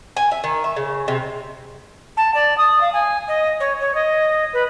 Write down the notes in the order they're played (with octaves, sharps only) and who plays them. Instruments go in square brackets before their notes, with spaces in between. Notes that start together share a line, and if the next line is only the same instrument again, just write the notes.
[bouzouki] G#5
E5
D#3
E5
C#3
C3
[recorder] A5
D5
D#6
F5
G#5
D#5
C#5
C#5
D#5
B4